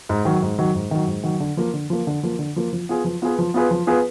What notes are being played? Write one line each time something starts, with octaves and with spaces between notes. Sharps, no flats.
G#2
D#3 F#3
G#2
D#3 F#3
G#2
D#3 F#3
G#2
D#3 F#3
D3
F3 A#3
D3
F3 A#3
D3
F3 A#3
D3
F3 A#3
F3
B3 F4 G#4 B4
F3
B3 F4 G#4 B4
F3
B3 F4 G#4 B4
F3
B3 F4 G#4 B4